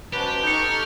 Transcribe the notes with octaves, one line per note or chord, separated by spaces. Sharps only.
B2 F#3 C#4 G4 B4 C5 A5
D#4 A4 C#6 F6 G6 C#7